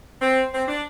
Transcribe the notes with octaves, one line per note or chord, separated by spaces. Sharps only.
C4
C4
D4